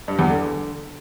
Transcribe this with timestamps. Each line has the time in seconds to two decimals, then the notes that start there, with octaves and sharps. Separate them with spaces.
0.08 G2
0.19 E2
0.29 D3